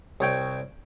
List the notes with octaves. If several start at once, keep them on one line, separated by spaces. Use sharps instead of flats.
C2 C#5 G5